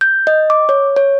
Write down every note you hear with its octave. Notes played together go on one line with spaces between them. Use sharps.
G6
D#5
D6
C#5
C#5